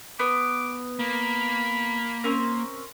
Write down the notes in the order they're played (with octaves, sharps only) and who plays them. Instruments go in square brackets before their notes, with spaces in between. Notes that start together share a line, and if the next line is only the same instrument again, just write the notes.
[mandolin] B3 [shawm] D6
[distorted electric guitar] A#3 [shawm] B5
[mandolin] C4 C#4 A#4